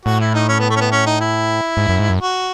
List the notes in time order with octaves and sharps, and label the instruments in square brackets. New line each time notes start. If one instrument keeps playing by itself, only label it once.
[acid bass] A2 [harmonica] F#4
[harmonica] E4
D#4
C#4
B3
A3
C#4
B3
C#4
D#4
E4
[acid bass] G#2
F#2
G#2
F#2
[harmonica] F#4